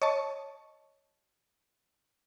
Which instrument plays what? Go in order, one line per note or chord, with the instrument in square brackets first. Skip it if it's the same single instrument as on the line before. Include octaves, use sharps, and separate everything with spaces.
[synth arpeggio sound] C#5 D#5 A5 C#6